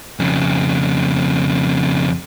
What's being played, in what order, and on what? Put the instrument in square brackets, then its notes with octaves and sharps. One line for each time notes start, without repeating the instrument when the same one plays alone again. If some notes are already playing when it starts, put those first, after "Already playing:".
[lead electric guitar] F2 C#3